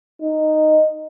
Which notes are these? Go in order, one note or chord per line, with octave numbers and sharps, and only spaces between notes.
D#4